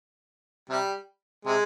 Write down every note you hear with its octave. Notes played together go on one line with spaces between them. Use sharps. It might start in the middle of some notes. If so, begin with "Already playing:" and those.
C3 G3
C3 G#3